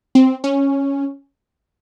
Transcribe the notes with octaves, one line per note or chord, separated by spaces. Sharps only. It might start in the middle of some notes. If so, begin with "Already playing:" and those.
C4
C#4